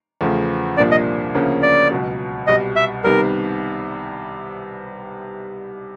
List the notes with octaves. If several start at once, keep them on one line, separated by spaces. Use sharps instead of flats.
E2 C#3 F3 A3
C2 A#2 F3 A#3 D4 D5
D#5
D2 C#3 F3 A#3 C#4
D5
C#2 B2 F#3
C2 B2 G3 D#5
E5
C2 C3 D#3 G3 B3 A#4